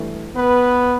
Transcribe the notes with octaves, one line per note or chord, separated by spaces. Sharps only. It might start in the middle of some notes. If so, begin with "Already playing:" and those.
Already playing: G2 E3 A3
B3 B4